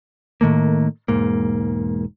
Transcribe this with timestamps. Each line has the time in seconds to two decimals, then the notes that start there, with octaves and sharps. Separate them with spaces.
0.41 A2 D#3 A3 A#3
1.08 E1 G#2 A#3